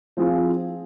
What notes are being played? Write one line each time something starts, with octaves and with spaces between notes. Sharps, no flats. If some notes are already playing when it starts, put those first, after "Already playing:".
F3 C4 F4 G#4